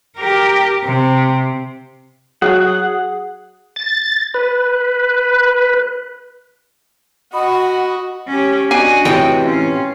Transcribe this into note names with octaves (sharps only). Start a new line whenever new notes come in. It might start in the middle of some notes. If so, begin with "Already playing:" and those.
G4 A#4
C3
F#3 G#4 F#5
A6
B4
F#4 D#5 F#5 B5
C#4 G4
D4 F#4 D#5 G#5
A2 C3 E3 G5
C#4 F4